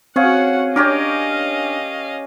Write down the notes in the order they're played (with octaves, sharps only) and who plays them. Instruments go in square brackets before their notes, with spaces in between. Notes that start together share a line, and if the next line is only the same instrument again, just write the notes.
[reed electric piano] C4 F5 [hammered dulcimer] C#4 G#4 [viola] F#4 F#5
[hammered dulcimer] C#4 G4 A#4 [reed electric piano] D4 D6 [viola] D#5 F5